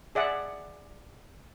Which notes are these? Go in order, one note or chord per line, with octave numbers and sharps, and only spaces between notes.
G#4 D5 E5 F#5